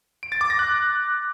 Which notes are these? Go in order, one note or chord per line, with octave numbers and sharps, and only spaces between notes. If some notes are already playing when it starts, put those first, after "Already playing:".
D7
A6
D6
A#6
F#6